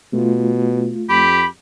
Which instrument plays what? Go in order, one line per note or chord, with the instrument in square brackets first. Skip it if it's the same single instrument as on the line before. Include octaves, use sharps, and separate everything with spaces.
[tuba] B2 [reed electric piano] A3 F4
[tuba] F2 [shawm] G4 [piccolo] B5